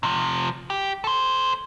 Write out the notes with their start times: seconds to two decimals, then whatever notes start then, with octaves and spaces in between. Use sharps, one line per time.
0.03 C3 F3
0.70 G4
1.04 A4 C5